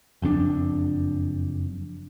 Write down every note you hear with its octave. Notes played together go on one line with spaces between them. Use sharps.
F#1 F2 A#2 D4